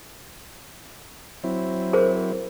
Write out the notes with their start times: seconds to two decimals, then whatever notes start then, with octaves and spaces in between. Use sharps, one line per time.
1.44 F#3 C4 E4
1.93 G#4 A#4 C5